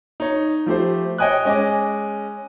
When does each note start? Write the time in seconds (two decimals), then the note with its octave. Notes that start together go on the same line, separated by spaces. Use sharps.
0.20 D#4 C#5
0.66 F3 A3 G4 C5
1.18 C#5 D#5 G5 G#5 D#6 F#6
1.45 G#3 C#4 D#5 G#5 D6